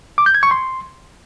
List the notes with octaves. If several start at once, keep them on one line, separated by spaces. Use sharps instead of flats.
D6
G6
G#6
C#6
C6